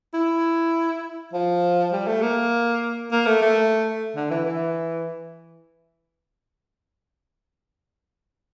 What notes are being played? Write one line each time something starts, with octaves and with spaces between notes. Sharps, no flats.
E4
F3
G3
A3
A#3
A#3
A3
A3
D3
E3
E3